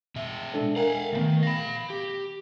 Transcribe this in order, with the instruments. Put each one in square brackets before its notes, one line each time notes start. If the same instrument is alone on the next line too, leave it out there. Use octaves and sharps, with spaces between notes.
[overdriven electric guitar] B2 E5
[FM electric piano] G#3 D4 A4
[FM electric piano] A#4 G#5 [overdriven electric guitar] F5 F#5
[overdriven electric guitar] D2 D#3 [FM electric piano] A3 B3
[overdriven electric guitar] F5 B5 [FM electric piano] A#6
[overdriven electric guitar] G4